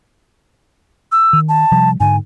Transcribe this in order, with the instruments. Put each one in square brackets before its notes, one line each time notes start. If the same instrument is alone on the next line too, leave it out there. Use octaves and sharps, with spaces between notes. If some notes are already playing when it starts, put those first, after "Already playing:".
[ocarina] E6
[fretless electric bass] D#3
[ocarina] A5
[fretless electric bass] C3 F3 G3
[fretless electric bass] G#2 D3 [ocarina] G#5